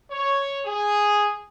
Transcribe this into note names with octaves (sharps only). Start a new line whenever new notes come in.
C#5
G#4